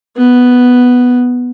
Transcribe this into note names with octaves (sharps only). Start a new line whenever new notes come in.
B3